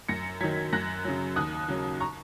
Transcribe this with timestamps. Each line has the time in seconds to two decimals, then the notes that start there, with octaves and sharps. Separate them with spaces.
0.09 F#2 A#6 C#7
0.41 D#3 F#3 G#6 B6
0.73 F#2 F#6 A#6
1.05 C#3 F#3
1.36 D#2 D#6 F#6
1.68 C#3 F#3
2.00 A#5 C#6